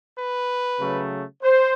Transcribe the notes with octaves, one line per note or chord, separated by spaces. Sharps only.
B4
C#3 F#3 A3
C5